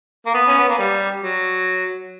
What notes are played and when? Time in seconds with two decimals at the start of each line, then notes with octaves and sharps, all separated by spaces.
0.26 A#3
0.34 B3
0.48 C#4
0.58 B3
0.68 A#3
0.78 G3
1.24 F#3